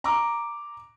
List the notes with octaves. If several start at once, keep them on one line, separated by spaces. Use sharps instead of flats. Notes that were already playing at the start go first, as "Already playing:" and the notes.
A#5 D6